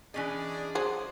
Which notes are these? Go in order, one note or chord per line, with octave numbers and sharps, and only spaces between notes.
E3 C#4 D4 G#4 D5 D#5
F#3 G#4 C5